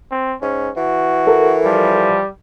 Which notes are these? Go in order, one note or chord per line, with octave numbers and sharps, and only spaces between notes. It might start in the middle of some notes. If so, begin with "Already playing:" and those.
C4
G#2 C#4
E3 F#4
A4 A#4
F3 G3